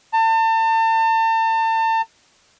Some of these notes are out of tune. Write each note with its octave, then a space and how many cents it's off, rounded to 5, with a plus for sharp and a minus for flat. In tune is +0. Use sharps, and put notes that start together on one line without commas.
A5 +35